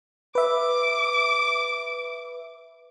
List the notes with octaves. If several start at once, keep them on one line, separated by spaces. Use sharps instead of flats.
B4 E5 D6